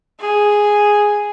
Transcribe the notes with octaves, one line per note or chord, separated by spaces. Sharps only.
G#4